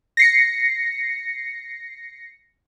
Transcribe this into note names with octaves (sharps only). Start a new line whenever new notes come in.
A#6 C7 C#7